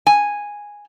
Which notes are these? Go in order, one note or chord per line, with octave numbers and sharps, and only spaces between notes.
G#5